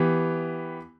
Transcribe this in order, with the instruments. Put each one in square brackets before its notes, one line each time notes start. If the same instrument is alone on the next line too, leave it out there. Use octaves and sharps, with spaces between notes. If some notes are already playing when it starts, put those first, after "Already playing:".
Already playing: [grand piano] E3 B3 G4